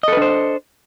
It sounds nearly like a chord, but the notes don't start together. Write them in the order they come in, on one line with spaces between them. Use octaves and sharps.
D#5 A4 B4 D4 C5